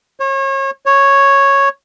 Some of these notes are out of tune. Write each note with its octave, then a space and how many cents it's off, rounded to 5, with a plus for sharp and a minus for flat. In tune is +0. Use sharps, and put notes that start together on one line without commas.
C#5 -35
C#5 -5